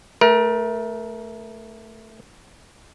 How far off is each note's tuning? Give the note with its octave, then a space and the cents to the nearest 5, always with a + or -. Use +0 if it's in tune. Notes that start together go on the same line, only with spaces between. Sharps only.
A3 +0 A#4 +30